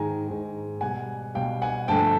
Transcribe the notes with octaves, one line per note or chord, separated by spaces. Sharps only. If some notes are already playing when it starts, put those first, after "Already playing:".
Already playing: G#2 D#3 G#3 G#5 A#5
G#2 D#3 G#3
B2 G3 F#5 G#5
B2 G3 F5 G5
F#5 G#5
G2 D3 F3 A3 G5 A5